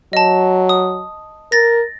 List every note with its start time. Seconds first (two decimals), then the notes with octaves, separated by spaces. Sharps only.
0.13 F#3 D#5 A5
0.69 D#6
1.52 A#4 A6 A#6